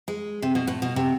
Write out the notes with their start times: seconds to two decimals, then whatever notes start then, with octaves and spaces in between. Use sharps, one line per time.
0.08 G#3
0.42 C3
0.55 B2
0.67 A2
0.82 B2
0.96 C3